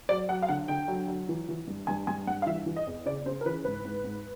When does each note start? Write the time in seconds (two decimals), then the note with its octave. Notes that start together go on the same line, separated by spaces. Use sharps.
0.09 F#3 D5
0.29 F#3 F#5
0.42 F5
0.49 D3 F#5
0.68 D3 G5
0.88 F#3
1.08 F#3
1.29 E3
1.49 E3
1.67 G2
1.87 G2 G#5
2.07 G2 G#5
2.27 G2 F#5
2.42 F5
2.46 E3 E5
2.66 E3
2.76 D#5
2.87 E2
3.06 C#3 D5
3.26 C#3 C5
3.41 A#4
3.46 E3 B4
3.65 G#2 B4
3.85 G#2
4.04 G#2